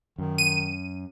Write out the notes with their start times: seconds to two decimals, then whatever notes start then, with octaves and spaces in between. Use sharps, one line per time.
0.18 F#2 D#3
0.38 D#7